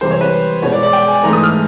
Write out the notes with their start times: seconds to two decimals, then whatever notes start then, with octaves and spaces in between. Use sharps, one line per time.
0.01 C3 E3 G3 C5
0.11 C#5
0.21 B4
0.62 B2 G#3 B3 C#5
0.72 D5
0.83 D5
0.93 G5
1.08 G#5
1.23 G#2 E3 A3 A#5
1.33 D#6
1.43 F6